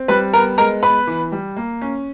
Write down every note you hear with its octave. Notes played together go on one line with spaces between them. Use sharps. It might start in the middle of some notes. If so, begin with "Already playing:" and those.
Already playing: C4
G3 B4 B5
B3 A#4 A#5
G#3 A#4 A#5
B3 B4 B5
E3
G3
A#3
C#4